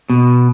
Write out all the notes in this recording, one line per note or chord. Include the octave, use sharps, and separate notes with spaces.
B2